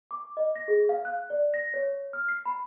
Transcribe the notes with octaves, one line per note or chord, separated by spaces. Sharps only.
D6
D#5
A#6
G#4
F5
F#6
D5
A#6
C#5
F6
C7
B5